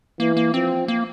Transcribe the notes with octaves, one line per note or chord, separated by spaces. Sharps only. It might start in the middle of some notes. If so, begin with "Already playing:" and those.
E3 A#3
A#3
F3 C4
A#3